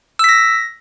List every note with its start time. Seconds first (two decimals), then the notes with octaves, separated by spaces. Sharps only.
0.19 E6
0.24 B6
0.29 A#6